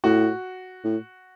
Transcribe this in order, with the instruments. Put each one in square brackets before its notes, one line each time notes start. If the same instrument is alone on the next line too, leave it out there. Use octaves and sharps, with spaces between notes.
[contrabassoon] A2 [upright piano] F#4
[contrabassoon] A2